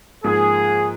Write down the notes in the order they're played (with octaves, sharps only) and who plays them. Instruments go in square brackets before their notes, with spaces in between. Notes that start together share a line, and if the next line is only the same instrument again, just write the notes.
[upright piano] G#2 F3 A#3 [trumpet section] G#4